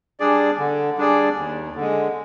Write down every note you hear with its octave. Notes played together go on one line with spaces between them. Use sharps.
G3 D4 G#4 D5
D3
G3 D4 G#4 D5
D#2
D3
G#3